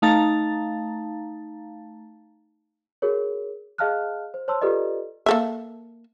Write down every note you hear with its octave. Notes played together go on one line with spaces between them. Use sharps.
A3 D#4 F5 A5 A#5 A6
F#4 G#4 A#4 C#5
G#4 D#5 F5 A5 F6 F#6
C5
C5 C#5 A5 C6 E6
F4 G4 A4 B4 D5 D#5
A#3 A4 E5